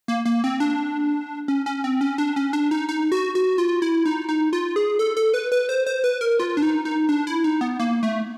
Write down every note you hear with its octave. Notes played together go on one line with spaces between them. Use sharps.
A#3
A#3
C4
D4
C#4
C#4
C4
C#4
D4
C#4
D4
D#4
D#4
F#4
F#4
F4
E4
D#4
D#4
F4
G#4
A4
A4
B4
B4
C5
C5
B4
A#4
F4
D4
D#4
D#4
D4
E4
D#4
B3
A#3
A3